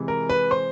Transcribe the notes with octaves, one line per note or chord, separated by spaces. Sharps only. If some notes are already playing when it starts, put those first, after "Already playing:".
Already playing: C3 E3 G#3
A#4
B4
C5